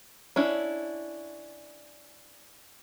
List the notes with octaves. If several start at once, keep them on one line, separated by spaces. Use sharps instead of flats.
C#4 D4 E4